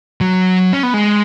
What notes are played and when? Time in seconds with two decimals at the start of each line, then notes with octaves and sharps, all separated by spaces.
0.21 F#3
0.73 C#4
0.83 B3
0.94 G#3